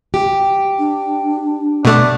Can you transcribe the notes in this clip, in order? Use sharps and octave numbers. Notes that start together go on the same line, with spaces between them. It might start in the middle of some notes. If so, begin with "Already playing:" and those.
G4
D4
B2 A3 D4